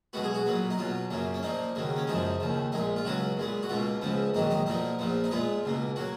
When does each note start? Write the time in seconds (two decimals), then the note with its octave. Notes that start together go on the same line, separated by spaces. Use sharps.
0.13 B1 B2 G#3 B3 F#4
0.24 G#4
0.35 F#4
0.46 B1 A#2 F#3 B3
0.70 D#4
0.78 B1 B2 F#3 F4
1.11 F#2 C#3 F#3 A#3
1.34 C#4
1.43 A#2 F3 A#3 D#4
1.75 D#2 C#3 F#3 A#3
1.96 C#4
2.07 F#2 C#3 F3 G#3 D#4
2.40 D#2 C#3 F3
2.72 A#1 A#2 G#3 D#4
2.96 F4
3.05 C#2 C#3 F#3 B3 F#4
3.37 A#2 G#3 B3
3.63 F#4
3.69 C#2 B2 A#3 F4
4.02 C#2 C#3 F3 B3
4.34 A#1 G#2 D#3 F#3 D#4
4.50 D#4
4.66 B1 A#2 F3 A#3 D#4
4.99 A#1 A#2 F3 B3
5.24 D#4
5.31 A#2 G#3 B3 F4
5.64 C#2 B2 A#3
5.96 F#3 A#3 F#4